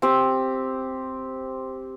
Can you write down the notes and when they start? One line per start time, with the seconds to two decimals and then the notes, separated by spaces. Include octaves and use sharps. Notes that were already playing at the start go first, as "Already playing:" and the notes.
0.02 C4 G4